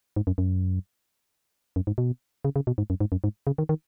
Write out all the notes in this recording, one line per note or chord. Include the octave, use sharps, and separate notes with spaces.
G#2
F#2
F#2
F#2
G#2
B2
C#3
C#3
B2
G#2
F#2
G#2
F#2
G#2
C#3
D#3
D#3